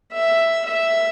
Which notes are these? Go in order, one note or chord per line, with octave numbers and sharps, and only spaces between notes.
E5
E5